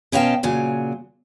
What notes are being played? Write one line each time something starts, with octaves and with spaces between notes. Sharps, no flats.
B2 C#4 D#5 F5 G5 A5
A#2 C#3 F#3 G#5